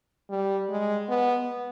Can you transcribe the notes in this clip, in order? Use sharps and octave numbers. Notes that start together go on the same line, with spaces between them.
G3
G#3
B3